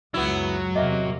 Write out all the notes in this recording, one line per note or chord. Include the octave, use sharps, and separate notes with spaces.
C#2 F#2 F#3 B3 E4
E2 C3 A#3 D#5 E5 F#5